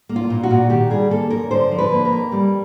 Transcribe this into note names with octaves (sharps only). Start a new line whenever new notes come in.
A#3
F4
A#2
F#4
A#2
D#3 G4
G3 G#4
A#3 A4
F#2 A#4
D3 C5
F3
B4
A#3
A#4
F2
G3